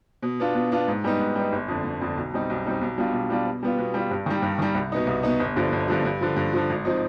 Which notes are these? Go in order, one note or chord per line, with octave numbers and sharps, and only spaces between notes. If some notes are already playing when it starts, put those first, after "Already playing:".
B2
B3 D4 F4
B2
B3 D4 F4
G#2
G3 B3 D#4
G#2
G3 B3 D#4
G1
F2 D3
G1
F2 D3
B1
B2 G3 C4 D#4
B1
B2 G3 C4 D#4
B1
B2 G3 D4 F4
B1
B2 G3 D4 F4
B2
G3 B3 F4
B2
G3 B3 F4
G2
D#3 G3
G2
D#3 G3
C2
B2 B3 D#4
C2
B2 B3 D#4
G1
G2 D3 F3
G1
G2 D3 F3
G2
D3 F3
G2
D3 F3
G#1
F3 C4 D#4